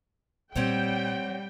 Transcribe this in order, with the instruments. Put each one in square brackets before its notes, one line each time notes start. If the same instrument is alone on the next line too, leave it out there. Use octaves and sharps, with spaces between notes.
[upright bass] A#2 [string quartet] G3 [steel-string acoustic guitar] C4 C#5 F#5 [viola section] G5